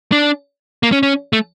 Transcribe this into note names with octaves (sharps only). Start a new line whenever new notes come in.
D4
A#3
C#4
C#4
A3